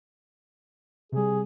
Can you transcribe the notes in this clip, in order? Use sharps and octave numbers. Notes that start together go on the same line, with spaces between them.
C3 G3 G#4